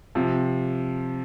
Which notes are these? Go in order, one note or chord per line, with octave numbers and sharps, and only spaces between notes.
C3 F3